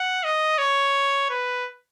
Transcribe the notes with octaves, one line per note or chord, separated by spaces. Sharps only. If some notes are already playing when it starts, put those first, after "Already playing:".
Already playing: F#5
D#5
C#5
B4